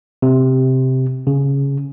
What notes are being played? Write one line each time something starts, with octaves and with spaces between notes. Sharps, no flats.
C3
C#3